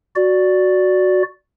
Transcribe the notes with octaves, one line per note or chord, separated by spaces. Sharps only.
F#4 D5